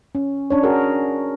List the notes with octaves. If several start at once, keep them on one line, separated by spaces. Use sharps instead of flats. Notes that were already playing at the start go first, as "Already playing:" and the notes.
C#4
C#4 D4 C#5
F#4 G#4 A#4